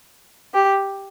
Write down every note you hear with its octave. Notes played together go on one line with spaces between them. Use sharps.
G4